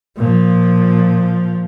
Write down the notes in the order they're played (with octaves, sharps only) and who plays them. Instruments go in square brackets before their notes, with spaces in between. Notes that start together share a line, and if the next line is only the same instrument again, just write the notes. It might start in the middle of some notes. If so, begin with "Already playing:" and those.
[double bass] A#2 F3